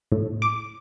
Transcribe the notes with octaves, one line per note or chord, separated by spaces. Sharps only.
A2
D6